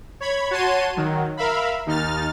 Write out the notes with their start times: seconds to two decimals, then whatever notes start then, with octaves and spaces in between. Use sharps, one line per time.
0.21 C#5 B5 G#6
0.51 F#4 C#5 A5 C6 D#7
0.96 D#3 F#3
1.37 A#4 E5 F5 B5
1.86 D#2 D#4 F6 A6